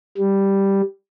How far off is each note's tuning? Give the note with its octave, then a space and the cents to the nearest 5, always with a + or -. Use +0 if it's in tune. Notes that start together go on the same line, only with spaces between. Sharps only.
G3 +0